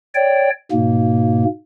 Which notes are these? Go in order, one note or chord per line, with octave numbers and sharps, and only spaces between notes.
C#5 D5 G5
G#2 B2 A#3